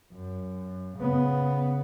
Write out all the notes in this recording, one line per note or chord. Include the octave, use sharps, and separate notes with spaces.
F#2
C#3 B3